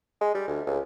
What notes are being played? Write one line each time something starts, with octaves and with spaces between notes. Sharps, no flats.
G#3
G3
D2
C#2